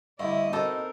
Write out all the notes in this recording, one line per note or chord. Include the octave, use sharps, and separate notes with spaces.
G2 D3 A3 E4 D5 D#5
B2 C4 D#4 A4 A#4